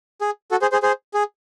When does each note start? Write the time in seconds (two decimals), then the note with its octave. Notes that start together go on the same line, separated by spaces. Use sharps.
0.21 G#4
0.51 F#4 A4
0.62 G#4 C5
0.72 G#4 C5
0.83 G#4 C5
1.14 G#4